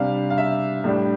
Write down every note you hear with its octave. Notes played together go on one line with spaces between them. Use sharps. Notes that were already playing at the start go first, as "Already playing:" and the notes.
Already playing: C3 G3 D4 F5
F5
E5
A2 G3 D4